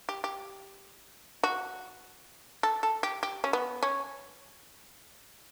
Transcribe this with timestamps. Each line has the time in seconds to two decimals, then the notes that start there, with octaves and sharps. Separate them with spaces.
0.09 G4
0.24 G4
1.43 F#4
2.63 A4
2.83 A4
3.03 G4
3.23 G4
3.44 C#4
3.53 B3
3.83 C#4